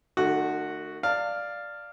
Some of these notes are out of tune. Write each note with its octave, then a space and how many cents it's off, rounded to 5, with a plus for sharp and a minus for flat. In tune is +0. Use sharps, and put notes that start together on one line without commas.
D#3 -45 A3 +10 F#4 +0
D5 +5 F5 +0 A5 +45